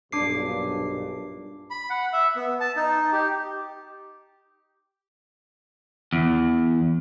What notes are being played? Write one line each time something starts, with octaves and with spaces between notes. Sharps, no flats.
B1 G2 A#2 D4 D6 C7
B5
F#5
E5
B3
A5
D#4
G4
E2